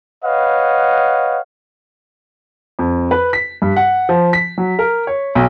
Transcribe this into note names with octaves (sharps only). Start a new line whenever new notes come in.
B4 C#5 D#5 F5 F#5
F2
B4
B6
G2
F#5
F3
B6
F#3
A#4
C#5
B1